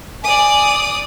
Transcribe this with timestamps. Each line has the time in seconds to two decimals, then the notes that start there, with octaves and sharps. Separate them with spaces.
0.24 D5 G#5 D#6